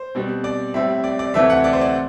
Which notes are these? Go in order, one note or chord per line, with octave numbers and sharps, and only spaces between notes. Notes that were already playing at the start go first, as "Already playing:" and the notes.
Already playing: C5
B2 G3 C4
D5
A2 G3 C4 E5
D5
D5
D2 C3 E3 A3 C4 E5
F#5
D5
C5
D5